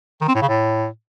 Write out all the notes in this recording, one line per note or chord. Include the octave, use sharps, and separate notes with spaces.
D#3
C4
A2
C#3
A2